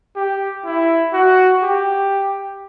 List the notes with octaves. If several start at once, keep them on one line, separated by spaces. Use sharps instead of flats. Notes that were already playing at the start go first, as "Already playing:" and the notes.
G4
E4
F#4
G4